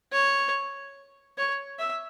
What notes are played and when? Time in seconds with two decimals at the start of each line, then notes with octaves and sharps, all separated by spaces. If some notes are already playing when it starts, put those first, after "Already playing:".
0.13 C#5
1.38 C#5
1.79 E5